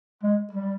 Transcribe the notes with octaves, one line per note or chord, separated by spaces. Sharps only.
G#3
G3